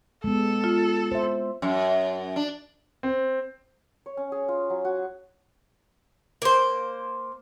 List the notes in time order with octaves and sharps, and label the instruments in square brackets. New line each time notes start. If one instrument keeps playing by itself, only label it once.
[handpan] G#3 B3 [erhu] A4
[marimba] F4
[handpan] C5 E5
[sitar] F#2
D4
[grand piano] C4
[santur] C#5
C#4
G#4
F4
F#3
F#4
[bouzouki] A#3 C5